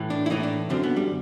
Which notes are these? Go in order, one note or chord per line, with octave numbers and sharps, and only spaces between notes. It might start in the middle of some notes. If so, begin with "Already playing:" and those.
Already playing: A2 E3
D4
E4
A2 E3 D#4
D4
F#2 D3 C4
B3
G3